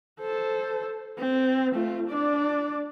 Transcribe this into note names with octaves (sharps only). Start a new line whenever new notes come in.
A4 C5
C4
A3 F4
D4 D5